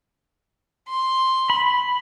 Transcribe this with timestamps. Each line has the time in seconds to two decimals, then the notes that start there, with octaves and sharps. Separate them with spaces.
0.88 C6
1.50 B5